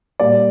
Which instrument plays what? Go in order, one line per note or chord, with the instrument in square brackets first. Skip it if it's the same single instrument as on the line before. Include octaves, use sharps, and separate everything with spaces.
[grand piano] A#2 G3 A#3 D5